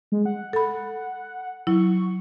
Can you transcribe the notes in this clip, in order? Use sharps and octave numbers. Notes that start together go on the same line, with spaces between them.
G#3
F#5
A4 B5
F#3 E4 C#6